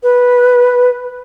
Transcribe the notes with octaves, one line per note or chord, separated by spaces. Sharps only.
B4